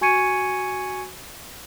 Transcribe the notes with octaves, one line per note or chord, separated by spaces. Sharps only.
F#4 G#5 C#6 G#6 C#7 D#7